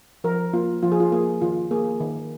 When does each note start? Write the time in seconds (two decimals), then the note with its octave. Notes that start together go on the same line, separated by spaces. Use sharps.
0.24 F3 A#4
0.53 A#3 F4
0.83 F3 F4
0.92 G#4
1.00 F4
1.12 A#3 G#4
1.42 D#3 F4
1.71 A#3 G#4
2.00 D#3